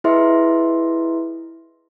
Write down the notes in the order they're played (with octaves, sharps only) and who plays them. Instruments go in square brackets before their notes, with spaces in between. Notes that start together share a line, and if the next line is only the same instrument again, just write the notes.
[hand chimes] E4 G#4 B4 D#5 E5 C6